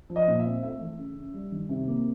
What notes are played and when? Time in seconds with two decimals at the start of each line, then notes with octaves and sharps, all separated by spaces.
0.10 F3
0.16 D#5
0.28 A#2
0.40 E5
0.45 C4
0.63 A3 E5
0.81 E3
0.98 C#3
1.16 C#4
1.34 G3
1.52 D#3
1.69 C3
1.87 A#3